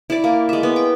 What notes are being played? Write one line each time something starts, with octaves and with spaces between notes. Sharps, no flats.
E4 D5
A#3
G#3 E5
B3
G5